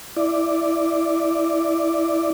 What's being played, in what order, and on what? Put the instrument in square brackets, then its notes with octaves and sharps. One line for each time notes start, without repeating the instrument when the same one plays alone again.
[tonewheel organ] E4 D5